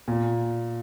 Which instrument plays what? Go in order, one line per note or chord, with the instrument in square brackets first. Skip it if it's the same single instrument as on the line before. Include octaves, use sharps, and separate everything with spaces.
[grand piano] A#2